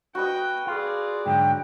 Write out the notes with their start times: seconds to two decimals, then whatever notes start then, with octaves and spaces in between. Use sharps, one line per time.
0.15 F#4 B4 D#5 G5
0.67 F4 G#4 D5
1.26 G#2 D3 F#3 G5